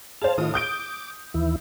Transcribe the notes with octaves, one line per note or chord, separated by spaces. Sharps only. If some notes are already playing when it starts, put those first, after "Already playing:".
G#4 C5 F5 A5
A2 D#3 F4 D#6
D6 D#6 G6 D7
D#2 E3 E4